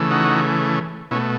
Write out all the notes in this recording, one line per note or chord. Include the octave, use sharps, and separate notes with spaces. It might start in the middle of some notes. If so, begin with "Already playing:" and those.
Already playing: C#3 E3 A3
D#4 F#4
B2 A3 C#4 E4